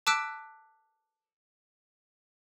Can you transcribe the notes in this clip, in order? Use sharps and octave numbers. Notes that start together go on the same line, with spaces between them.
A5 D6 E6 F#6 B6 D7